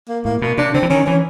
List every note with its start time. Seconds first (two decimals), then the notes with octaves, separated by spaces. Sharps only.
0.09 A#3
0.25 A2 A#3
0.41 B2 A#3
0.58 C3 D4
0.74 D3 C4
0.83 E3
0.90 D#3 C#4
1.06 E3 C#4